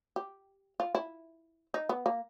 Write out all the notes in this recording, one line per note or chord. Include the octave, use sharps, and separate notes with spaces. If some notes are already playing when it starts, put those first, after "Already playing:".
G4
F4
E4
D#4
B3
A#3